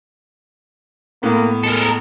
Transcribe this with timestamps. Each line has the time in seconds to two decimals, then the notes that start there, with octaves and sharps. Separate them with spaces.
1.23 A2 A#3 B3
1.63 G#3 A4 A#4